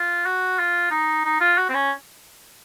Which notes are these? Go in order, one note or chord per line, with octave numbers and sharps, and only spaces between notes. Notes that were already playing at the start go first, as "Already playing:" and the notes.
Already playing: F4
F#4
F4
D#4
D#4
F4
F#4
C4
C#4